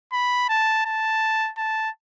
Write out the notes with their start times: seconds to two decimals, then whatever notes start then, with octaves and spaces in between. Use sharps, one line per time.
0.12 B5
0.49 A5
0.85 A5
1.57 A5